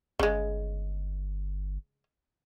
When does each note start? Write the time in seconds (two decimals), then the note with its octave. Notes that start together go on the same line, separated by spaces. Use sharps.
0.19 G1 C#3 G#3